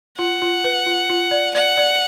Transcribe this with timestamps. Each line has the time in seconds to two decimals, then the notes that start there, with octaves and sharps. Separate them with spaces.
0.18 F4 F#5
0.42 F4
0.64 B4
0.87 F4
1.10 F4
1.31 D5
1.54 D5 F#5
1.77 D5